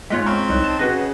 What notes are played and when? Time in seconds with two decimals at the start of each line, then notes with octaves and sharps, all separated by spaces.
0.10 G#2 G#3 F4 C#5 F#6 B6
0.26 C4 A#5 C#6 F6
0.49 C2 D#4 C#5 F#6
0.64 A5
0.79 C#3 F#4 B4 D#5 F#5 F#6